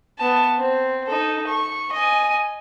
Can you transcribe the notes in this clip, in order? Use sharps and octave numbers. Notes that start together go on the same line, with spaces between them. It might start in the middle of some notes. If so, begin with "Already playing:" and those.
B3 A5
C4
D#4 A4
C#6
D#5 G#5